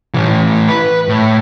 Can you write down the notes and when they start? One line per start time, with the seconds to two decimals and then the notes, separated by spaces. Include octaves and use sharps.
0.14 A2 E3
0.68 B4
1.08 A2